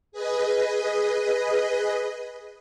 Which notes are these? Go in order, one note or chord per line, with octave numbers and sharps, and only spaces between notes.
G#4 B4 D#5